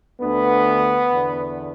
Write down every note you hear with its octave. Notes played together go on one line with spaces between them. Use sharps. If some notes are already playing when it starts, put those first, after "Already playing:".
D2 D3 B3
E2 D3